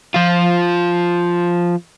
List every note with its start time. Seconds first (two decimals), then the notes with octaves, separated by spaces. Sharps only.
0.14 F3 F4